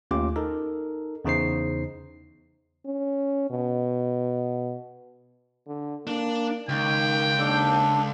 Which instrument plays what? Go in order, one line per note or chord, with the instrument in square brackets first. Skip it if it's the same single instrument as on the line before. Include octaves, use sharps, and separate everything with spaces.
[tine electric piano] D#2 A3 C#4 F4 G4 D6
D#4 A4 A#4
E2 C#3 D#4 C5 C7
[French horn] C#4
B2
[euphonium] D3
[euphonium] A#3 [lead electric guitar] D4
[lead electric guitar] C#2 [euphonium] D#3 [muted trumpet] G5
[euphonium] D#2 [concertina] D4 A4